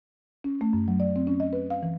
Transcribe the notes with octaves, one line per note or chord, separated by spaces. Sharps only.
C#4
A3
F#2
F#3
D5
C4
C#4
D#5
B4
F5
E3